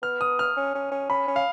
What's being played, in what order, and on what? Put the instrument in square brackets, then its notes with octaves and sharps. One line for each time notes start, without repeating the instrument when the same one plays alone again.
[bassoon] B3 [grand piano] F6
[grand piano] D#6
F6
[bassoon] C#4
C#4
C#4
[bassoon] C#4 [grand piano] B5
[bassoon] C#4
[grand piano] F5